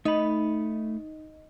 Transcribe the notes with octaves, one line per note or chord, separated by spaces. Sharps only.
A3 D#4 D#5 B5